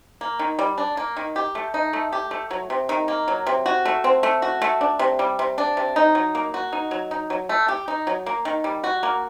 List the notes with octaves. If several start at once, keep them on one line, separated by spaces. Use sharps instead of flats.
A#3
D#3
G3
D4
A#3
D#3
G4
A3
D#4
A3
G4
A3
F#3
C3
D#3
A#3
F#3
C3
F#4
A3
C4
A3
F#4
A3
D4
C3
G3
C3
D4
C3
D#4
F#3
A#3
F#4
D#4
F#3
D#4
F#3
A3
G4
D#4
F#3
A#3
D#3
G3
F#4
A#3